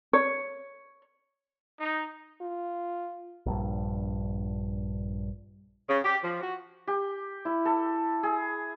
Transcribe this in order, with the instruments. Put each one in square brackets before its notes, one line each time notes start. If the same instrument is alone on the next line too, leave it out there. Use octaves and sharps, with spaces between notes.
[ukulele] C#5
[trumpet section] D#4
[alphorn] F4
[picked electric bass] A#1 G2
[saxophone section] C#3
G4
F3
F#4
[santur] G4
E4
A4
G#4